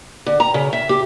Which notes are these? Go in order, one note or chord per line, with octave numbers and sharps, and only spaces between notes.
D3
A#5
C#3
E5
G4